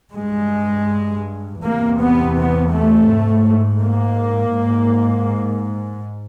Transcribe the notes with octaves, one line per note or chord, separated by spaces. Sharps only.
G2 G#3
E2 C3 A#3
B3
B3
A3
G#2
A#3
G#2